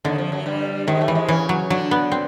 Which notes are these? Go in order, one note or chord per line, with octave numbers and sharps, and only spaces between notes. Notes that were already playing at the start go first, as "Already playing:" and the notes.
D#2 D3 D#3
F2 F3
F#2 F#3
G2 G3
G#2 D#3 G#3
A2 A3
E3
G#2 G#3
C#3 E3 C#4
F#3
D3 F#3 D4
B3
C4